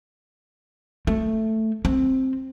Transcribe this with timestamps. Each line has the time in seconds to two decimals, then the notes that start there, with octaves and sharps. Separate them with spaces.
1.07 A3
1.85 C4